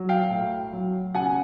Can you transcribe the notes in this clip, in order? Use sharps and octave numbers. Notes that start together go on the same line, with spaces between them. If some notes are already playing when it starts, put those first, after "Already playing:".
Already playing: F#3
F5 G5
A2
F#3
C#3 F#5 G#5